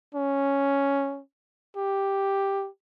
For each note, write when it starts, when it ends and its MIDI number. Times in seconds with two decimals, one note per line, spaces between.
0.15 1.21 61
1.77 2.68 67